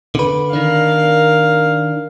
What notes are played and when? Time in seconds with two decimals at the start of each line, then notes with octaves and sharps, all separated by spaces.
0.15 D3 B4
0.53 D#3 D4 A#4 F5